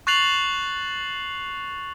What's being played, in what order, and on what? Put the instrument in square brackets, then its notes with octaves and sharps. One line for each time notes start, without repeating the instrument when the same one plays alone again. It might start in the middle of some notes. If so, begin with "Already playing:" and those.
[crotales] C#6 F#6 A6 C7 F7 F#7